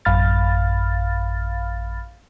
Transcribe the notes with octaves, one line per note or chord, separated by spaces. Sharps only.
A1 F#2 F5 B5 F6 A6